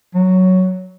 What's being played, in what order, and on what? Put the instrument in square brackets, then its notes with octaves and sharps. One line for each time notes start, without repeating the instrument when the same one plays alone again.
[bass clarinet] F#3